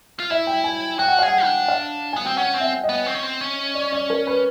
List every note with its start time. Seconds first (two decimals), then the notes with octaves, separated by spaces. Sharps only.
0.20 F4
0.30 E4 E5
0.47 G5
0.64 G#5
0.99 F#4 G5
1.08 F#5
1.19 G#4 F5
1.28 F#5
1.45 D4
1.68 F5
2.13 B3 G#5
2.25 C4 G5
2.37 C#4 F#5
2.54 C4
2.60 E5
2.84 D#5
2.89 B3
3.06 C4
3.14 C#4
3.23 C4
3.41 C#4
3.75 D5
3.92 D5
4.10 A#4
4.27 B4